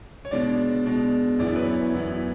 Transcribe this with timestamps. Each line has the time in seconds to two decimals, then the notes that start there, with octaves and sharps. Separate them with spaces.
0.25 C#5
0.31 B2 G#3 D4 D5
0.86 B2 G#3 D4
1.39 F#2 E3 B3 E4 D5
1.47 C#5
1.56 B4
1.62 C#5
1.94 F#2 E3 B3 E4